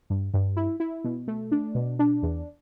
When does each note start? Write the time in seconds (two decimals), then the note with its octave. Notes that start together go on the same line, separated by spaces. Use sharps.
0.10 G2
0.34 G2
0.57 E4
0.80 E4
1.04 B2
1.28 A3
1.52 D4
1.75 B2
1.99 D4
2.23 E2